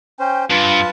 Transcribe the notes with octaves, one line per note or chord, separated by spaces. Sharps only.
C#4 C5 G5
G2 F4 B4 A5